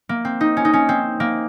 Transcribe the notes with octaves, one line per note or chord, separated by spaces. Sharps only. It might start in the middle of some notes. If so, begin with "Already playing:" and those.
A#3
C4
D#4
C#4
D#4
C#4
C4
A#3